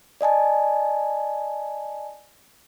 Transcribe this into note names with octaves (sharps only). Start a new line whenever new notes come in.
D5 D#5 G#5 A5